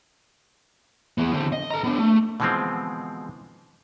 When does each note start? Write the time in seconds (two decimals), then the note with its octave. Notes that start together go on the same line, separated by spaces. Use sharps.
1.18 E3 B3
1.33 D3 C4
1.52 D#5
1.70 A4 A#5
1.84 B3 D4
1.99 A3
2.40 B2 D3 E3 F3 G#3 C4